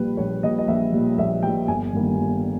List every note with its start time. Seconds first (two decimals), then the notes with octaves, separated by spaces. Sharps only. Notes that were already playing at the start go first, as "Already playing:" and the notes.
Already playing: A#1 A#2 G3 B4
0.17 A#1 C#5
0.43 A#2 G3 D#5
0.58 D#5
0.68 A#1 E5
0.93 A#2 G3
1.18 A#1 E5
1.43 A#2 G3 G5
1.68 G1 G#5
1.93 G2 D#3 G3 A#3
2.18 G1